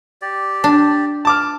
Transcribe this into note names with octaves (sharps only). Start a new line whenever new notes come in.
G4 D5
D4
A5 D6 F6